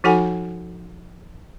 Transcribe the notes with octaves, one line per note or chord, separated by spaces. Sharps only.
F3 D#4 F#4 A4 F#5 G#5